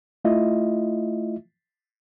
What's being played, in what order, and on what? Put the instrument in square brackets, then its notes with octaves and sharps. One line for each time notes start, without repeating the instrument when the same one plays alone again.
[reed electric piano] A3 E4 F4 D#5 E5